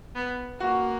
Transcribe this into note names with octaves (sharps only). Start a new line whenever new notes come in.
B3
A#3 F#4